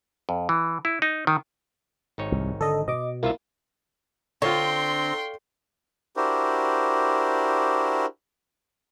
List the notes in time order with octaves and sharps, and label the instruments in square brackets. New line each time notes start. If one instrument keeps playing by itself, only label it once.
[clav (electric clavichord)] F2
E3
E4
D#4
D#3
G#1 D#4 C#5
[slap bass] C2
[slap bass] D3 [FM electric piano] A4 D#5
[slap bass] B2 [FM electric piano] D#5 D6
[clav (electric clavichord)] C2 F4 E5 [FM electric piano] A#3 E4
[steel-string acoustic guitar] D3 [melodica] C4 A#5 [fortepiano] F4 C#5 [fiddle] G5 C6
[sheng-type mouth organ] D4 E4 F#4 G4 A#4 C5